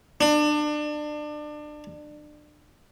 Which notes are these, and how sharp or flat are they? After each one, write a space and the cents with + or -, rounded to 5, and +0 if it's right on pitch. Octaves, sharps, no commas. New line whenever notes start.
D4 +30